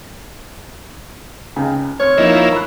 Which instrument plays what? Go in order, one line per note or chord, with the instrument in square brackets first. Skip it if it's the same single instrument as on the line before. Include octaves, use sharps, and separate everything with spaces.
[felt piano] C#2 C#3 G5
[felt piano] C4 F6 [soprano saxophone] C#5
[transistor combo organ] F3 A#3 E4 [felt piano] D#4
[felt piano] B5 F#6